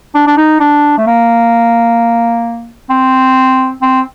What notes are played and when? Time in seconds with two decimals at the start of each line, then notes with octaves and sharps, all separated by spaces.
0.15 D4
0.27 D4
0.37 D#4
0.60 D4
0.98 A3
1.07 A#3
2.90 C4
3.82 C4